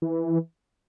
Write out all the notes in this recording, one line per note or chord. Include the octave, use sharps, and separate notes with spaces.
E3